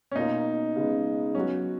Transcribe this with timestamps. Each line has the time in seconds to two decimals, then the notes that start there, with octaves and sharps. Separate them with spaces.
0.11 C#4
0.16 B2 A#3 D#4 F4
0.76 C#3 G#3 B3
1.35 F#3 B3 C#4 F#4